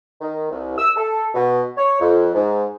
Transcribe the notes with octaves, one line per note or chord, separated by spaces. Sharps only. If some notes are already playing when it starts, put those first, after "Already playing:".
D#3
C2
E6
A4
B2
C#5
F2
G#2